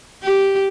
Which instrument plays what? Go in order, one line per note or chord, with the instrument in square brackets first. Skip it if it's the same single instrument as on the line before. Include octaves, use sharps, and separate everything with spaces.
[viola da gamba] G4